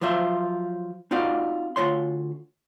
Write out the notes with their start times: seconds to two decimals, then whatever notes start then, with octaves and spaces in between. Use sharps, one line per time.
0.01 F3 F#3 F4 C5 E5
1.11 C4 D#4 F4 F#4 D5
1.76 D2 F#3 F4 C#5 C6